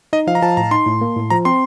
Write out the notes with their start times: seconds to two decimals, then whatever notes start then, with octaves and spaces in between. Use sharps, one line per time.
0.13 D#4 D#5
0.27 F3 F5
0.35 A#5
0.42 F3 A5
0.57 A2 A#5
0.71 D#4 C6
0.86 A2
1.01 A#3
1.16 A2
1.30 F3 A#5
1.45 C4 C6